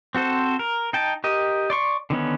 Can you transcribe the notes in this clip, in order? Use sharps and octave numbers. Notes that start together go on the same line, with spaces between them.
C4 F#4 A4 C5
A#4
D#4 G5 A5
G4 A#4 D#5
D5 C6 C#6
D3 D#3 B3 C#4